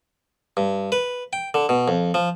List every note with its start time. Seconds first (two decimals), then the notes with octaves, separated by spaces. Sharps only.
0.57 G2
0.92 B4
1.33 G5
1.54 D3
1.69 B2
1.88 F2
2.14 F3